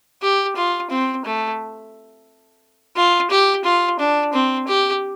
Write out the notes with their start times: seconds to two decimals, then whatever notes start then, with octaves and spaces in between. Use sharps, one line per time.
0.22 G4
0.56 F4
0.91 C4
1.25 A3
2.96 F4
3.30 G4
3.65 F4
3.99 D4
4.33 C4
4.67 G4